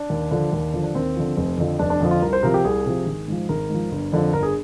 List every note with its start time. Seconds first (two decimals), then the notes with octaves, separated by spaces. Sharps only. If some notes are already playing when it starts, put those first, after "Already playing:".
Already playing: D4
0.10 D#2
0.31 D3 F3
0.53 D#2
0.74 D3 F3
0.83 D4
0.95 D#2 C4
1.16 D3 F3
1.37 F1
1.58 F2 D3 F3
1.79 F1 D4
1.90 D4
2.01 F2 D3 F3
2.11 F4
2.22 C2 A#4
2.33 C5
2.43 C3 F3 A#4
2.54 G4
2.64 C2 G#4
2.86 C3 F3
3.06 G#1
3.28 G#2 F3
3.49 G#1 A#4
3.70 G#2 F3
3.91 G1
4.13 F2 D3 F3
4.33 G1 A#4
4.43 G#4